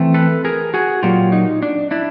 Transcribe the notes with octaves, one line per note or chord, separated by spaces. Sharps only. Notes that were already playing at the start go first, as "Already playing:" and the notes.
Already playing: E3 A3 C4
A4 B4
G#4 A#4
F#4 G#4
A#2 F#3 A#3 F4 G4
D#4
D4
D4 E4